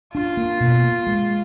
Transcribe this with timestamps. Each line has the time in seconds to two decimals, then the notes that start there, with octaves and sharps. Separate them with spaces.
0.14 D4 F4
0.37 A#3
0.60 B2
0.84 A#3
1.07 G#3